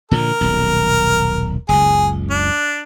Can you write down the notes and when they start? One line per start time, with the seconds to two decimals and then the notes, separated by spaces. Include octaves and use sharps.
0.11 A#2 D3 F3 A#4
0.41 D#1 B1
1.69 F#1 C#2 G#4
2.30 D4